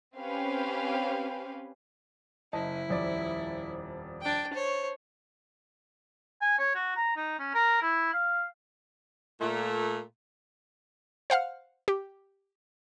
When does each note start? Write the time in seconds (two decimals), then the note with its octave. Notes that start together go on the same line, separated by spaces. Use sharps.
0.17 C4 C#4 G4 B4 F5
2.53 F#1 E4 D#5 A5
2.89 D#1 F2 D5
4.22 D4 G5
4.53 C5 C#5
6.41 G#5
6.58 C#5
6.75 F#4
6.96 A#5
7.16 D#4
7.39 C#4
7.54 A#4
7.82 E4
8.13 F5
9.41 A#2 A3
11.30 C5 F5 F#5 F6
11.88 G4